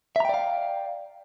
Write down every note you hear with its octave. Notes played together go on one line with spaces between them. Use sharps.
D5 E5 F5 G5 A#5